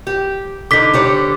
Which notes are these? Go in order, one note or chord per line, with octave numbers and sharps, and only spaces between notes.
G4
D3 D#4 D6 B6
D3 G3 C#5